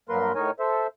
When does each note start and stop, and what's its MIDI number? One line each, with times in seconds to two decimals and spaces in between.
0.09 0.32 43
0.09 0.32 54
0.09 0.32 58
0.09 0.32 70
0.09 0.32 71
0.09 0.32 84
0.35 0.51 45
0.35 0.51 63
0.35 0.51 70
0.35 0.51 73
0.35 0.51 80
0.60 0.87 69
0.60 0.87 72
0.60 0.87 76